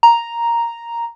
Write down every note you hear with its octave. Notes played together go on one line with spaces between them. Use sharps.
A#5